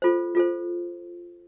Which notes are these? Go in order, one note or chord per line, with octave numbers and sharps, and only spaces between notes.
F4 A4 C5
F4 A4 C5